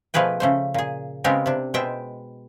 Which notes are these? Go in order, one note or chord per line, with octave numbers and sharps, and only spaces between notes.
B2 F3 A3 G#4 B4 G5
C#3 A3 C5
A#2 G#4
C#3 G#3 B3 C4 G4 A#4
C3 D4
B2 G#3 C5 E5 G5